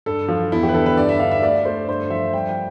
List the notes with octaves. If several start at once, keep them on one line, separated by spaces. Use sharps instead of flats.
G2 A4
F3
E2 E4
G4
B4
D3 A4
B4
G2 D5
E5
D3 F5
E5
A3 D5
A3 C5
G2 C5
F3 E5
G3 G5
G5